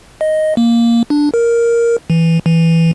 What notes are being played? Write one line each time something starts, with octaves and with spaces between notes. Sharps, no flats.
D#5
A#3
D4
A#4
E3
E3